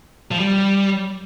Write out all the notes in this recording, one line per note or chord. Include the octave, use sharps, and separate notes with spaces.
F3
G3